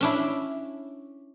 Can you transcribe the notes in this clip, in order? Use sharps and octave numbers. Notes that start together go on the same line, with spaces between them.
C#4 D4 E4